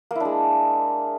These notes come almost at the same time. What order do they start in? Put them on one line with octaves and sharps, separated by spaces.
A#3 E4 D4 G#3